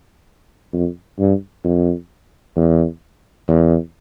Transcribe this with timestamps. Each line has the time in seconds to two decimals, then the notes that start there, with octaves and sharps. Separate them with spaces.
0.73 F2
1.19 G2
1.64 F2
2.56 E2
3.48 E2